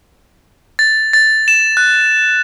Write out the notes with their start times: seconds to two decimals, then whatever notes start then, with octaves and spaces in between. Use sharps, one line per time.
0.79 A6
1.13 A6
1.48 E7
1.77 F#6